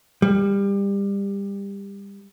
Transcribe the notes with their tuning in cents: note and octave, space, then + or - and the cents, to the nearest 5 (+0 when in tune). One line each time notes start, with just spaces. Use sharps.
G3 +25